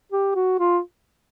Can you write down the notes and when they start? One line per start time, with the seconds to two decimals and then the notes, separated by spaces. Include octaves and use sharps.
0.12 G4
0.35 F#4
0.59 F4